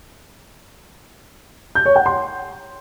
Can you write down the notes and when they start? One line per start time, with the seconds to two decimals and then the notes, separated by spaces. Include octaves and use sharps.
1.75 G6
1.86 C#5
1.96 F#5
2.06 C6